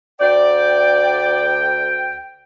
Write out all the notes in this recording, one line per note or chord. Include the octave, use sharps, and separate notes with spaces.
D2 D5 G5